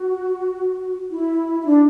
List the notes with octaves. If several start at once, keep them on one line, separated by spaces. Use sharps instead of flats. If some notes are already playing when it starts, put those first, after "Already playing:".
Already playing: F#4
E4
E4
D4